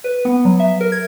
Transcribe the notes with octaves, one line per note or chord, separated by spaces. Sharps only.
B4
B3
F#3
E5
A#4
G#6